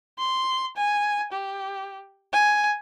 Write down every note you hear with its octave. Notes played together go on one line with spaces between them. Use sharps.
C6
G#5
G4
G#5